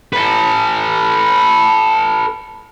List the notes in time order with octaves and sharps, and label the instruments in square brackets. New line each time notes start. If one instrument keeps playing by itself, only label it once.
[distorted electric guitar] A4 B4